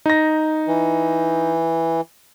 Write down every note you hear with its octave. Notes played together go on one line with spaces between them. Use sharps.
D#4 A#6
E3